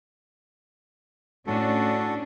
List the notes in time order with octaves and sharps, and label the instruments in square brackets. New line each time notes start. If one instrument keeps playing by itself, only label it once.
[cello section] A2 C#4 D4 [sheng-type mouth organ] F#4 A4